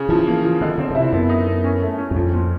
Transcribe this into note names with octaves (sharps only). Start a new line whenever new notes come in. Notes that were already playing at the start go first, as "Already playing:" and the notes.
Already playing: C#3
E3 F3
A#3
F3
D3 D#3
C#3 C4
C#3
C3 E4
F#2 B3
D#4
B3
C#4
A3
C#4
E2
F2 F3
A#2